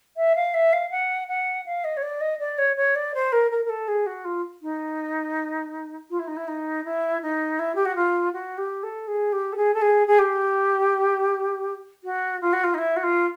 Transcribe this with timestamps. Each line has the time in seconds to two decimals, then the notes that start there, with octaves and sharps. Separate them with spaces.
0.17 E5
0.35 F5
0.54 E5
0.73 F5
0.91 F#5
1.28 F#5
1.66 F5
1.84 D#5
1.97 C#5
2.02 D5
2.21 D#5
2.39 D5
2.58 C#5
2.76 C#5
2.95 D5
3.14 C5
3.32 A#4
3.51 A#4
3.65 A#4
3.69 A4
3.88 G#4
4.06 F#4
4.25 F4
4.62 D#4
6.10 F4
6.19 E4
6.27 D#4
6.37 E4
6.48 D#4
6.85 E4
7.22 D#4
7.59 E4
7.75 G4
7.85 F#4
7.95 F4
8.33 F#4
8.58 G4
8.83 A4
9.07 G#4
9.32 G4
9.52 A4
9.56 G#4
9.74 A4
9.81 G#4
10.07 G#4
10.19 G4
12.04 F#4
12.41 F4
12.53 F#4
12.64 F4
12.74 D#4
12.78 E4
12.96 F#4
13.03 F4